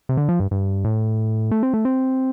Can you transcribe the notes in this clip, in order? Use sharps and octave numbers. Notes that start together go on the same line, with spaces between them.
C3
D3
F3
G2
G2
A2
A3
C4
A3
C4